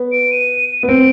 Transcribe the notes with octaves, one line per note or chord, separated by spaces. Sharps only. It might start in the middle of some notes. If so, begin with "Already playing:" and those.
Already playing: B3
D7
D#7
B3
C4 D7